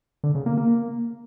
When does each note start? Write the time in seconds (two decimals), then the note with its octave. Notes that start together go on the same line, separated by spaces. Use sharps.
0.24 D3
0.35 C#3
0.46 A#3
0.57 A#3